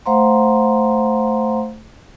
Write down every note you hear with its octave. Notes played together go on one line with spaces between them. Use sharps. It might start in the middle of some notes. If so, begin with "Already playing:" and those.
A3 C5 F5 F#5 A#5 C6